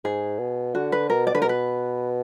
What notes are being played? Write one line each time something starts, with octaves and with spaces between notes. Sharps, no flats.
G#2 G#4
B2
D3 F#4
B4
B2 A#4
D5
D3 B4
A#4
B2 B4